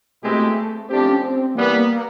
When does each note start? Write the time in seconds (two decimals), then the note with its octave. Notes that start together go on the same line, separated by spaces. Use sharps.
0.23 B2 G#3 A3 C4 E4 G4
0.89 F3 A3 C4 D4 G4
1.06 C#4
1.23 C4
1.55 E3 G3 A#3 B3